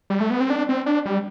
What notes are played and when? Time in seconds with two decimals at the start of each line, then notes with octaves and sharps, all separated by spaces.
0.10 G3
0.20 A3
0.30 B3
0.40 C4
0.50 D4
0.69 C4
0.86 D4
1.05 G3